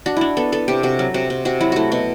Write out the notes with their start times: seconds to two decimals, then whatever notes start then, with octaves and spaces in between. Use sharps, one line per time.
0.06 D4 F#4
0.17 D4 E4
0.37 B3 A4
0.52 B3 A4
0.68 C3 G4
0.83 C3 F#4
0.99 F#3
1.14 C3 F#4
1.30 C3
1.45 C3 F#4
1.60 F#3 E4
1.72 A3 E4 F#4
1.92 B2 F#4